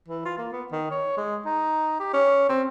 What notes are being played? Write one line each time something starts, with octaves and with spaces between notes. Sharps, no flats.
E3
F4
A#3
B3
D#3
C#5
G#3
D#4
G4
C#4
C4